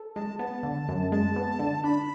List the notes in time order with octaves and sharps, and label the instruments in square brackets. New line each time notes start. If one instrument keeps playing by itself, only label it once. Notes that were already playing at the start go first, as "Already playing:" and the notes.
Already playing: [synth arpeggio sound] A4
[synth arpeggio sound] G#3 [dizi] A5
[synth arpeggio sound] B3 [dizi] A5
[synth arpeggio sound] D3
F#2
[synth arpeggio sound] G#3 [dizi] A5
[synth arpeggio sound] B3
D3
[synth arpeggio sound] D4 [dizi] B5